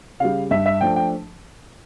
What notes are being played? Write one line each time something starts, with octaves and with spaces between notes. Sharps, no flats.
C#3 G3 F5
G2 E5
E5
F3 A3 D4 G5
G5